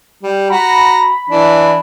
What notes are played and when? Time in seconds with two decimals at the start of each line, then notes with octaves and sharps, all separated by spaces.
0.22 G3
0.50 F#4 A#5 B5
1.30 E3 D4